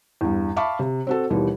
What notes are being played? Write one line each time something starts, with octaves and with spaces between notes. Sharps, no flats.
E2 G2
E5 F5 A5 B5 C#6 D6
C3
C4 F#4 A4
D#2 B2 E3 G3